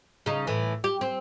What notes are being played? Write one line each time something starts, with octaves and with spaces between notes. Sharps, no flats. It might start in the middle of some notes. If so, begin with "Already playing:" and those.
C#3 D#4
A2 E3
G4
C4